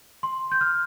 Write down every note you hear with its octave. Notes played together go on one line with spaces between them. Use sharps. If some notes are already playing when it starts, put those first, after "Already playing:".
C6
G6
F6